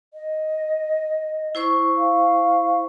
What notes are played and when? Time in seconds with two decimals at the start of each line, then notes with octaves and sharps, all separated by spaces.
0.14 D#5
1.55 E4 C5 C#6
1.97 F5